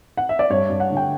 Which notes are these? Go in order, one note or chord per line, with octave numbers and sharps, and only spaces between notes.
F#5
E5
D5
G2 C#5
G2
F#5
D3
G5